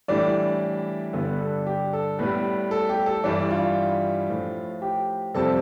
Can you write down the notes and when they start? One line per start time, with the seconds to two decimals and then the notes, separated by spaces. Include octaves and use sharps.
0.08 A2 E3 G3 D4 D5
1.13 G2 D3 G3 B3 B4
1.40 A4
1.66 G4
1.93 A4
2.19 A2 G3 B3 B4
2.71 A4
2.89 G4
3.06 A4
3.24 G2 E3 G3 D4 D5
3.51 F4 F5
4.29 A2 F3
4.82 G4 G5
5.34 F2 C3 G3 A4 A5